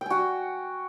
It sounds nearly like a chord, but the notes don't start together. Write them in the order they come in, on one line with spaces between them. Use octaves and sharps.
G5 G#5 F#4